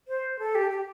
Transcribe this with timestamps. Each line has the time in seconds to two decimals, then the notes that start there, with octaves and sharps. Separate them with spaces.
0.08 C5
0.39 A4
0.55 G4
0.70 G4